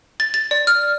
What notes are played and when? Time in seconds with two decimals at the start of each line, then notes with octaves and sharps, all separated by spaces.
0.20 A6
0.34 A6
0.51 D5
0.67 F6